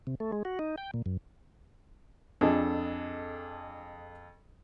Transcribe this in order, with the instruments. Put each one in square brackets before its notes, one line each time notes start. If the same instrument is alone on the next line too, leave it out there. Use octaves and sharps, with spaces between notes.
[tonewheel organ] C3
A3
G#3
F#4
D#4
G5
A#2
F#2
[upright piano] F2 [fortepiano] D4 [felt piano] G#4 A4 D#5